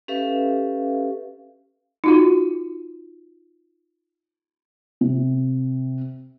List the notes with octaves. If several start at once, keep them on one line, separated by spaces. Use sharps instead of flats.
C#4 G4 A4 B4 E5 F5
D#4 F4 F#4
C3